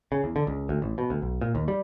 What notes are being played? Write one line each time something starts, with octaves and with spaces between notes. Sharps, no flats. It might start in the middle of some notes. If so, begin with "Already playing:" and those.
C#3
E2
D3
C#2
D2
A1
B2
D2
B1
A#2
D#2
G3